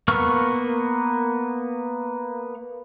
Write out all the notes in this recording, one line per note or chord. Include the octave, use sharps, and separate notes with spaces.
A#3 B3 C#6 F6